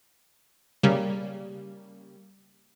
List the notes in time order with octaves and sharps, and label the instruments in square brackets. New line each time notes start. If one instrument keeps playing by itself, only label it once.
[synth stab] C#3 G3 A#3